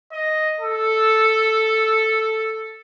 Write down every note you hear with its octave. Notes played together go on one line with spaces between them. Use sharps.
D#5
A4